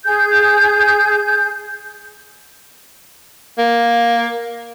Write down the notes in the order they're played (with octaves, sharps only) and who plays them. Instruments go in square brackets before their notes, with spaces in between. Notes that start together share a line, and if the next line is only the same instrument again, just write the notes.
[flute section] G#4 G6
[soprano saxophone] A#3